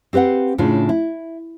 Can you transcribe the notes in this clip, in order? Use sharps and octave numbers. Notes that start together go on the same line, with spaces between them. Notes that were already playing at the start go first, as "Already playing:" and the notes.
C4 G4 B4 F5 F#5
A2 C#3 D4 F4
E4